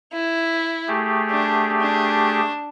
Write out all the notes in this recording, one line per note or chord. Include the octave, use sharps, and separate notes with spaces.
E4
A3 G4 G#4
D4
D4